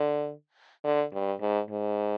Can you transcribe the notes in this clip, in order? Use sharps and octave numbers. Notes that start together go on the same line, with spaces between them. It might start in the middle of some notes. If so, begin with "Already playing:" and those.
Already playing: D3
D3
G2
G#2
G#2